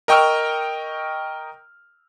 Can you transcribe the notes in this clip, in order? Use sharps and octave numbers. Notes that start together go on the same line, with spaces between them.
A#4 D#5 G5 C#6 E6 F6